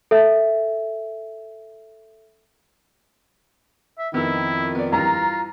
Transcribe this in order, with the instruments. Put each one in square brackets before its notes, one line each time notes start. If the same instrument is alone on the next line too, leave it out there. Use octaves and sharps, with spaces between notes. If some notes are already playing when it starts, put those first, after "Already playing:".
[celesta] A4 E5
[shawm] E5
[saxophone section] F2 D#3 [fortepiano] B3 E6 [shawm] E4
[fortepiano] B3 D5
[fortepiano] G2 E3 [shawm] F4 [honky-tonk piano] A#5